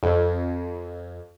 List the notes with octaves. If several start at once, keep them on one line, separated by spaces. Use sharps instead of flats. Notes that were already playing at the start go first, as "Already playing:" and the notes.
F2